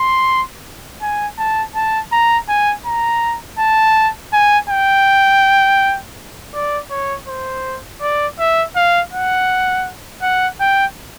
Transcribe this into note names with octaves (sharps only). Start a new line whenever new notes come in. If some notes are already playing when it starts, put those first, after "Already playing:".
Already playing: C6
G#5
A5
A5
A#5
G#5
A#5
A5
G#5
G5
D5
C#5
C5
D5
E5
F5
F#5
F#5
G5